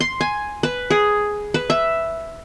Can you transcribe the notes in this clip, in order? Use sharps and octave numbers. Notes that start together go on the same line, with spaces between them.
C6
G#5
B4
G#4
B4
E5